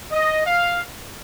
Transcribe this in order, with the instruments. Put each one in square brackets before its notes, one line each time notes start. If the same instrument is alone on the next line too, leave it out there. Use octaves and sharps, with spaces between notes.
[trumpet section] D#5
F5